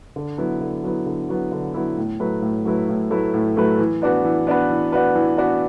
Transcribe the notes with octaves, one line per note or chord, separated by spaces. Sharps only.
D3
F#3 B3 E4
D3
F#3 B3 E4
D3
F#3 B3 E4
D3
F#3 B3 E4
A2
F#3 A3 E4 B4
A2
F#3 A3 E4 B4
A2
F#3 A3 E4 B4
A2
F#3 A3 E4 B4
E3
B3 D4 F#4 B4
E3
B3 D4 F#4 B4
E3
B3 D4 F#4 B4
E3
B3 D4 F#4 B4